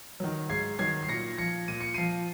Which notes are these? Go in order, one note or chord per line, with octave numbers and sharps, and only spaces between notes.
D#3 F#3
G#2 G#6 C7
D#3 F#3 G#6 C7
C7
A#2 A#6 C#7
F3 A#6 C#7
A#2 D#7
C#7
F3 C7 D#7